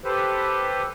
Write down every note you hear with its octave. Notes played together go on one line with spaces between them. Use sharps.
G4 A4 B4 C5